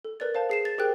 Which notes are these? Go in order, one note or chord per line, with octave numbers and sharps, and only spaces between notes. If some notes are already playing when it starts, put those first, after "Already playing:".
A4
A#4 B4 D5 A6
C5 F5 A5 G6
G#4 C7 E7
A6
G4 G#4 A#4 C5 G5 F#6